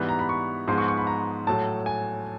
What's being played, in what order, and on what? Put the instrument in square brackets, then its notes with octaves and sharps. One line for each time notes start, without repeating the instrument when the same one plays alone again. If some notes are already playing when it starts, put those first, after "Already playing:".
Already playing: [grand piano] G#2 E3 G3 B3
A#5
B5
C#6
G#2 F3 G#3 B3 C6
C#6
C#6
B5
A#5
A2 F#3 A3 A5
G#5